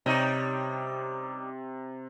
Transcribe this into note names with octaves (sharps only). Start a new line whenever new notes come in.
C3 G3 C#4 D#4